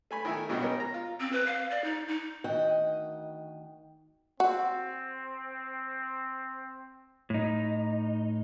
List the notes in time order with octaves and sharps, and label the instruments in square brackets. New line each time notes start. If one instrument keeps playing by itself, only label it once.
[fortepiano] A3 G#5 B5
D#3 A3 E4 E5 G#5
B1 G2 B2 F#4 G4 D#5
C#4 A#4
A#5
F4
[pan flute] C4
B4
F5
D5
D#4
D#4
[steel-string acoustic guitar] D2 D#3 D#5 F#5 G5
[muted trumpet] C4 [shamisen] F#4
[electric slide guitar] A2 D#4